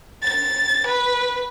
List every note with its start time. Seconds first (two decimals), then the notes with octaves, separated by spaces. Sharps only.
0.22 A6
0.87 B4